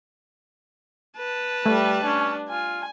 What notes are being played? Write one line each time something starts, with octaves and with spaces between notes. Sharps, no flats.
B4 A5
G3 A3
C#4 D4
F4 G#5